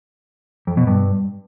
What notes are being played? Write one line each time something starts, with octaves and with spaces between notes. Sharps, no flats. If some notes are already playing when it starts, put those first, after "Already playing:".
F2
B2
G2